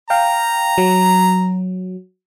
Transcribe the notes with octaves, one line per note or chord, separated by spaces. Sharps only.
F5 G5 A#5
F#3